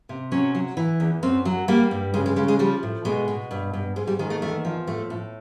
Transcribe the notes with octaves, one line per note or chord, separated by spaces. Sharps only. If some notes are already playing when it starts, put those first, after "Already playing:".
C3
F#3 C#4
F#3
E3
E2
F#2 C4
F#3
G3 A#3
G2
C#3 G#3
G#3
C#3 G#3
G#3
F3 G3
A2
B2 G#3
B2
G2
G2
G#2 G#3
G3
D#3 G#3
A3
E2 A3
F3
A2 A3
A2